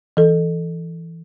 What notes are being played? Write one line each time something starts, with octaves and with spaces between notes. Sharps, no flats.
E3 A4